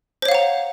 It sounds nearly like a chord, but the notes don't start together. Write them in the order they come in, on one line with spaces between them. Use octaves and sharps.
C5 C#5 F5 F#5 A#5